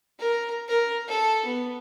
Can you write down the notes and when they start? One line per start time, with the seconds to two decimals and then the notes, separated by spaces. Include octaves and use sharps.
0.19 A#4
0.68 A#4
1.08 A4
1.45 B3